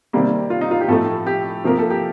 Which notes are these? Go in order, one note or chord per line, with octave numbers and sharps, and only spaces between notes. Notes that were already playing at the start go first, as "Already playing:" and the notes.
C3 D#3 G3 A#3
F4
D#4
F4
G4
A2 F3 A3 A4
G4
C3 F3 A#3 A#4
A4
G4